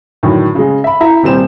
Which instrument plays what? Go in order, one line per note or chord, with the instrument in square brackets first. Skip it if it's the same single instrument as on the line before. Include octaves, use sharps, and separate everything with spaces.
[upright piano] A2 D3 D#3 F#3
C#3 G#3
E5 B5
E4 E5 A#5
D#1 C3 G3 C5 E7